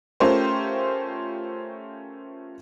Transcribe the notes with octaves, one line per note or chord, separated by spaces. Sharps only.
A3 C#4 F4 G4 A#4 C5